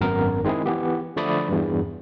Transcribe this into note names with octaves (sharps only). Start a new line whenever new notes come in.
G#1 F#2 B3 A#4
D#3 G#3 C4 E4 G#4
E3 B3 G4
D3 F3 A3 D5 B5 D#6
E2 G2